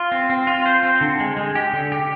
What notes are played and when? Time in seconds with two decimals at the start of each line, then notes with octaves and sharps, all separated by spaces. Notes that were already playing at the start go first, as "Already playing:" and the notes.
Already playing: F4
0.12 C4
0.30 C4
0.47 F4
0.66 C5
0.83 C4
1.01 D3
1.20 G#3
1.37 G#3
1.55 G4
1.73 D3
1.92 G4